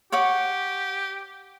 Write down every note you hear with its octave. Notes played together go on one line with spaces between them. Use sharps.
G4 C#5 F#5 D6